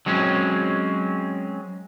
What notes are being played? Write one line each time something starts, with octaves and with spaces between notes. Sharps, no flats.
F#3 G#3 C4 C#4